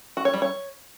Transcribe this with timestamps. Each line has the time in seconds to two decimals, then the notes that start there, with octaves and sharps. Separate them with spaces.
0.17 F#4
0.25 C#5
0.34 G3
0.42 C#5